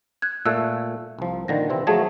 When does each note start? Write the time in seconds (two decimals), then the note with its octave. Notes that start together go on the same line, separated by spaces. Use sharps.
0.22 F#6 G#6
0.45 A#2 A3 E6 F#6
1.19 C2 F3
1.48 A#2 D3 D#3 A#6
1.69 C3 E3 C4
1.87 F3 F#3 A3 G#4 A5 G#6